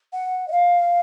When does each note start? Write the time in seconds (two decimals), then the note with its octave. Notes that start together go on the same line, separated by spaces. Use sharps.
0.13 F#5
0.48 D#5
0.51 F5